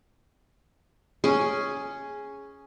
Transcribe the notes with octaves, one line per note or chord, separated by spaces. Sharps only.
C#4 G#4